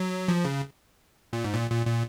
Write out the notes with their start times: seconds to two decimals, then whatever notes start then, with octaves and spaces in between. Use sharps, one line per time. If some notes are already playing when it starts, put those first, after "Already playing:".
Already playing: F#3
0.28 F3
0.45 C#3
1.33 A#2
1.44 G#2
1.54 A#2
1.70 A#2
1.86 A#2